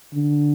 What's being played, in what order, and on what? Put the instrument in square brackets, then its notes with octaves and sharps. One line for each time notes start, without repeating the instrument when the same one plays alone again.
[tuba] D3